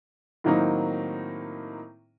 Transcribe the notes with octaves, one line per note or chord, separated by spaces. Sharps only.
A2 D#3 F#3 A#3 C4 D#4